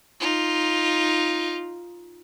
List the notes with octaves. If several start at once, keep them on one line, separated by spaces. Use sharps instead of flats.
D#4 F4